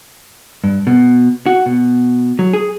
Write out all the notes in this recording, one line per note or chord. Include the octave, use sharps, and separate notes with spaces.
G2
B2
F#4
B2
F#3
G#4